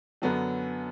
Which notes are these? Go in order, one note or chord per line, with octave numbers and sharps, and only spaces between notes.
F#2 D3 F#3 B3